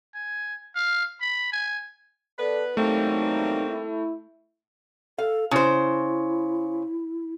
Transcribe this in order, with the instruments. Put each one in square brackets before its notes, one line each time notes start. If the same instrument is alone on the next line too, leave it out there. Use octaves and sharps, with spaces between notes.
[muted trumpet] G#5
F5
B5
G#5
[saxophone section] B3 B4 [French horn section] A4 D5
[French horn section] E2 F#3 D#4 [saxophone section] G3 A#3 C4 [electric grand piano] A3
[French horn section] E4
[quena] A4 [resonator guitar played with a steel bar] F5
[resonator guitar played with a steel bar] C#3 C5 [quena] E4